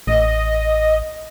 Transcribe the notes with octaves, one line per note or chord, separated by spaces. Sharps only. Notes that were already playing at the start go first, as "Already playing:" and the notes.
A1 D#5